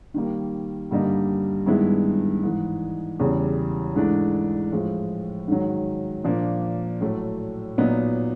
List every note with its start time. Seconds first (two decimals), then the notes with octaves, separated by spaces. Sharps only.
0.14 D#3 G3 A#3
0.91 G2 D3 G3 A#3 D#4
1.66 G2 D#3 G#3 B3 E4
2.43 G#2 E3 G#3
3.19 E2 C#3 E3 G3
3.96 G#2 E3 A3 D4
4.72 A2 F3 G#3
5.48 G#2 D#3 F#3
6.24 A#2 F3 A#3 D4
7.01 A2 F#3 A3
7.78 A#2 F#3 B3 D#4